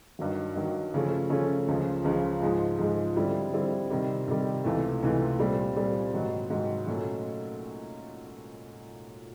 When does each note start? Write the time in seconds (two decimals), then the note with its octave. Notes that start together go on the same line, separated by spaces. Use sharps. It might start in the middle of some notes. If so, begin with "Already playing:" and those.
0.19 G2 D#3 F#3
0.56 G2 D#3 F#3
0.94 C#3 F3 A3 C#4
1.30 C#3 F3 A3 C#4
1.68 C#2 C#3 F3
2.04 C#2 C#3 F3
2.42 G#2 F3 G#3
2.79 G#2 F3 G#3
3.16 D3 G3 C4 E4
3.53 D3 G3 C4 E4
3.90 C3 D#3 G3
4.28 C3 D#3 G3
4.64 C#2 C3 E3 A3
5.02 C#2 C3 E3 A3
5.39 A#2 G3 C4
5.76 A#2 G3 C4
6.14 G#2 D#3 F#3
6.50 G#2 D#3 F#3
6.87 A#2 F#3 A3 C#4